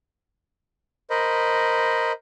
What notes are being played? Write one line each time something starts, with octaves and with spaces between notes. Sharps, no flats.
A#4 C5 D#5 B5